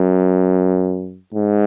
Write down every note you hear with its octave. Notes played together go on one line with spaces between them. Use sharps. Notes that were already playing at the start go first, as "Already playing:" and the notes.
Already playing: F#2
G#2